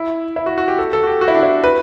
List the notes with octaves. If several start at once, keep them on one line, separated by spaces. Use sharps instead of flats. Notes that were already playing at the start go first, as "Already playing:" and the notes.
Already playing: E4
E4
F#4
F#4
G4
A4
A4
F#4
G4
F#4
E4
D4
E4
B4